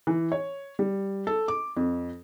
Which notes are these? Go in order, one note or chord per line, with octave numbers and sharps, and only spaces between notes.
E3
C#5
G3
A4
D6
F2